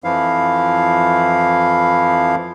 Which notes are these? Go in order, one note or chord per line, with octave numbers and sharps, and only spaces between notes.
F2 E3 F3 E4 F5